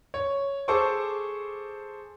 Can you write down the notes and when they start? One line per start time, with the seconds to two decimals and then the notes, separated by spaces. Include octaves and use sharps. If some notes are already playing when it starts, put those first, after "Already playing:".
0.14 C#5
0.68 G#4 A4 C5 C#6 D6